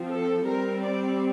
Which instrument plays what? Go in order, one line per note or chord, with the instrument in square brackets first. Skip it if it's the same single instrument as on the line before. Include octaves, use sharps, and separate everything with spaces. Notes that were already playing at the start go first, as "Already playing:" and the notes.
Already playing: [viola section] F3 C4
A4
G3 C4 A#4
D5